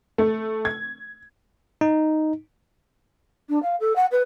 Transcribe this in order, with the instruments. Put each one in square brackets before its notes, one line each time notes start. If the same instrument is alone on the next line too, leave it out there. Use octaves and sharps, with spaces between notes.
[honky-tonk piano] A3
G#6
[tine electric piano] D#4
[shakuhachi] D4
F5
A4
F#5
B4